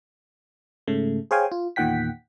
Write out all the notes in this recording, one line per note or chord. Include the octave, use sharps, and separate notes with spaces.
G#2 C#3 A3
G#4 C5 C#5 F5 G5 G#5
F4
E2 A#2 D#3 F#5 G5 B6